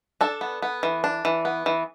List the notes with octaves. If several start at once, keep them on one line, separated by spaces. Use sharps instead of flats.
D4 A4
B3
B3
E3
D4
E3
B3
E3